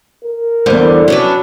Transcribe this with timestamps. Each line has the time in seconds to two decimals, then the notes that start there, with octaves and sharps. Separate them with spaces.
0.24 A#4
0.66 E2 G#2 D3 G3 C5
1.08 F#3 C#4 D4 B4